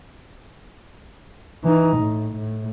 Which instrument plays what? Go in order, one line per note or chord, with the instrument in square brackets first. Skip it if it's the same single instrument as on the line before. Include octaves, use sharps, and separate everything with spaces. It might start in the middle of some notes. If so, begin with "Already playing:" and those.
[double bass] E3 D#4
A2
A2